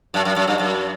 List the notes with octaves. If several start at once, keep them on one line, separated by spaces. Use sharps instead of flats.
F#2
F#2
F#2
G2
F#2